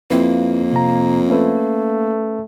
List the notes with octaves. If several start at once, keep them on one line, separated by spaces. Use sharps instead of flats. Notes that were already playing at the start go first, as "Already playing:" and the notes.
F2 A#3 C4 E4 B4
C3 A#5
A3 C#4 B4